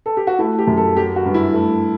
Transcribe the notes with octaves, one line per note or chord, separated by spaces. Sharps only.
A4
G4
F#4
A3 E4
G4
F#2
A4
F#3 G4
F#4
G2
E4
A3